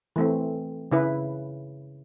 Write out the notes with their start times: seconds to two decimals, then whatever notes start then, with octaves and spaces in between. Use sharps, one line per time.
0.16 E3 A3 C4
0.91 C#3 E4 B4